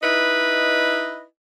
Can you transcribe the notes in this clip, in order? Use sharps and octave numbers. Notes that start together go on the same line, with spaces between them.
D#4 E4 B4 D#5